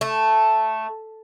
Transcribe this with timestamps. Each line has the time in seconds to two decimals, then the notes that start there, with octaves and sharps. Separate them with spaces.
0.01 A3